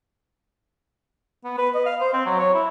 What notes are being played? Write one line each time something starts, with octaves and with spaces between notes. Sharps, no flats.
B3
B4
D#5
F5
C5
C4
F#3
C#5
E4